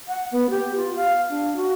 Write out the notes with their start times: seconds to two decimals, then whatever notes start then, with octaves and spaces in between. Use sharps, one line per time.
0.08 F#5
0.32 B3
0.50 G4
0.76 F4
0.94 F5
1.30 D4
1.56 F#4